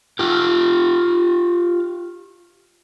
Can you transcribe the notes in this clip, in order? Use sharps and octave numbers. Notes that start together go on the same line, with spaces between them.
F4 G4